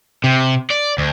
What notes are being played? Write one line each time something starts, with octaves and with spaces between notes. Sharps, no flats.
C3
D5
D2